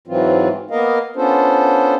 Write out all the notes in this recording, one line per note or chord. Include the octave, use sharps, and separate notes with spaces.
G#2 E3 F#3 C4 F4
A#3 B3 A#4 D#5 F5
B3 C#4 D4 F4 A4 C5